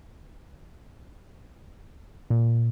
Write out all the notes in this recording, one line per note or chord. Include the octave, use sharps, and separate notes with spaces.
A#2